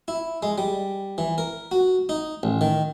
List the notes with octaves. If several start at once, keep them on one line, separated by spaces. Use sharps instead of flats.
E4
G#3
G3
E3
A#4
F#4
D#4
A1
D#3